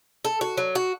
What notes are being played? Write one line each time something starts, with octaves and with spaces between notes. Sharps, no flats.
A4
F#4
F#3
F#4